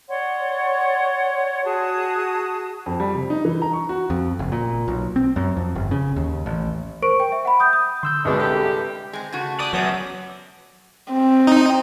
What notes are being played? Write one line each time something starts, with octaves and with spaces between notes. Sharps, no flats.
C#5 D5 F#5 C6
F#4 G#4 A5 D#6
F2
G3
C3
D#4
E3
A#5
C#6
F#4
F2
F#1
A#2
B1
C4
F#2
F2
G1
C#3
D#2
A1
A#4 C5 C#6 D7
G5
E5
F#5 B5
D#6 G6
D#6
D3 C6 E6 G6
C2 B2 G#3 D4
D3 G4 A4 B4
G#3 C4
C#3 A3 F#4
B4 D5 G5 D#6
F#2 F#3 B3 B4
C4
D#4